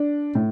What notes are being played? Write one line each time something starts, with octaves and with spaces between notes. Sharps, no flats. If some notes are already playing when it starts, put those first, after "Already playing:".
Already playing: D4
A2